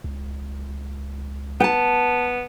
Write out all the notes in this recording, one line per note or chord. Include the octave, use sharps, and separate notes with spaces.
C#2
B3 G5 A5